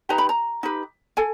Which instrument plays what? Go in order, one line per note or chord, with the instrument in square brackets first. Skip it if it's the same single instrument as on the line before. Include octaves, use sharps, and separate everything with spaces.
[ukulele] D#4 G4 B4 A#5
B5
A#5
D#4 G4 B4
A4 G#5